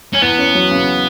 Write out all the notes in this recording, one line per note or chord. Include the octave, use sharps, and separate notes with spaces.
C#4
E2 B3
C#4
F#3
C#3